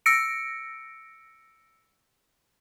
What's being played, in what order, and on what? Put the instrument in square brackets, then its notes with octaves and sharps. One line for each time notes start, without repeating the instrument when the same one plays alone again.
[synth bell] E6 A#6 C#7 D7